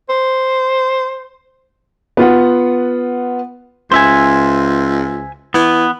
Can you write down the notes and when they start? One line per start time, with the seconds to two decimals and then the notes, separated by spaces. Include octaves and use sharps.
0.09 C5
2.17 B3 F4 F#5
3.92 C#2 C5 E5 G#5
5.54 E3 B3